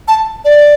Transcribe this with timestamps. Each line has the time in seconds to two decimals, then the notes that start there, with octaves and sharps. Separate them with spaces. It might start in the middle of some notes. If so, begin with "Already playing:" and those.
0.08 A5
0.45 D5